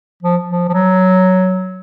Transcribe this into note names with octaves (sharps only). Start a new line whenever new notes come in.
F3
F3
F3
F#3